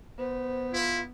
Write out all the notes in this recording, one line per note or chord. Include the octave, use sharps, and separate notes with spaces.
B3 C5
E4 F4